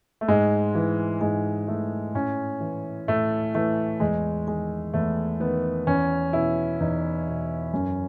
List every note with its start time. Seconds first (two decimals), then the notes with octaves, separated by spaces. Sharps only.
0.21 A3
0.28 G#2 G#3
0.75 E3
1.21 G#2 G#3
1.68 E3 A3
2.14 A2 C#4
2.60 E3
3.08 A2 A3
3.54 E3 A3
4.00 E2 G#3
4.47 D#3 G#3
4.94 E2 A3
5.40 D#3 B3
5.87 E2 C#4
6.33 B2 E4
6.80 E2 D#4
7.27 B2
7.73 F#2 C#4